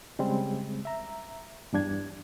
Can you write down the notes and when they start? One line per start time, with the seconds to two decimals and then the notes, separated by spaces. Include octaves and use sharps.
0.19 C#3 G3 G#3 C4
0.85 E5 A#5
1.73 E2 G2 D4 G#6